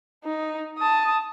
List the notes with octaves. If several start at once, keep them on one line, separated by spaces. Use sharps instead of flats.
D#4
A5 D#6